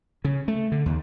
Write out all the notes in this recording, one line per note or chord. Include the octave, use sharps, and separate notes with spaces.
C#3
A3
D3
D#2